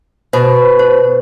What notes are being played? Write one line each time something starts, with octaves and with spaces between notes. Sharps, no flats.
B2 C5
C5